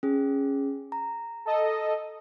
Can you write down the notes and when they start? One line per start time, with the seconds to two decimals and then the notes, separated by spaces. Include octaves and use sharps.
0.03 C#4 G#4
0.92 A#5
1.45 A4 D#5